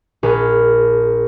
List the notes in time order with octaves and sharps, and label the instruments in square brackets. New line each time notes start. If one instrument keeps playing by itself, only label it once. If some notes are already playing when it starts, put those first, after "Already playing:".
[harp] A#1 G#4 B4 F6